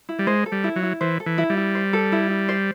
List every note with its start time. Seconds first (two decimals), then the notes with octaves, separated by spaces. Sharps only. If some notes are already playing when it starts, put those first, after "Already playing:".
0.09 E4
0.19 G3
0.27 G#3 C5
0.46 A4
0.52 G3
0.64 E4
0.76 F#3
0.83 E4
1.01 E3 C5
1.20 A4
1.26 E3
1.38 E4
1.50 G3
1.57 E4
1.75 C5
1.93 A4
2.12 E4
2.30 E4
2.49 C5